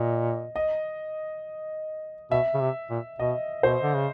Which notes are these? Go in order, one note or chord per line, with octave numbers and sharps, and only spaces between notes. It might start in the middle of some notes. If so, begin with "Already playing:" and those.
Already playing: A#2 D#5
D#5
B2 E5
C#3
C3
A#2
B2 D#5
B2 C5
D3
C#3